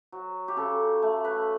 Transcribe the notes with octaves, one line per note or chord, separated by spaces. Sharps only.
F#3
G4
C#3 A4
A3
B4